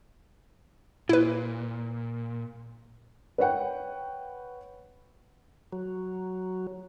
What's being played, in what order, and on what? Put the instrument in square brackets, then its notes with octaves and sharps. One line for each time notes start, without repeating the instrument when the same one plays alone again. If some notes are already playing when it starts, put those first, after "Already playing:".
[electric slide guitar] A#2 [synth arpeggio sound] E4 B4
[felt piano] B4 C#5 F#5 G5
[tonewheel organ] F#3